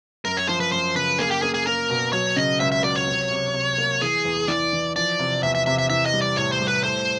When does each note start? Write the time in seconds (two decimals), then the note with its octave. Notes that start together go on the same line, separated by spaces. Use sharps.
0.25 F#2 A#4
0.37 C#5
0.48 F3 C5
0.60 B4
0.72 F#2 C5
0.95 C#3 B4
1.19 A#3 G#4
1.31 G4
1.42 A#3 G#4
1.54 G#4
1.67 A#3 A#4
1.90 B2
2.13 F#3 C#5
2.36 C#3 D#5
2.60 C#2 E5
2.72 E5
2.83 F#3 D5
2.96 C#5
3.07 C3
3.31 C3
3.54 C3
3.78 A#3
4.02 E3 G#4
4.25 E2
4.48 E3 D5
4.73 E3
4.96 F3 D5
5.19 C3
5.43 E2 E5
5.55 E5
5.66 C3 E5
5.78 E5
5.90 E3 E5
6.06 D#5
6.14 G3
6.22 D5
6.37 A2 C#5
6.52 C5
6.60 G3
6.68 B4
6.83 A3 C5